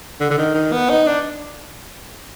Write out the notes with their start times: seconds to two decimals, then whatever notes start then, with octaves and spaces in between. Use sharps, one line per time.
0.20 D3
0.30 D3
0.38 D#3
0.55 D#3
0.73 B3
0.89 D#4
1.07 D4